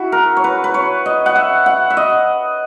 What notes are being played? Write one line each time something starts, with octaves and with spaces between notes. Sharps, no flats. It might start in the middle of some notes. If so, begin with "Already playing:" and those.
Already playing: E4 F#4
A#4
C#5
B4
B4
C#5
D#5
F#5
E5
F#5
E5
D#5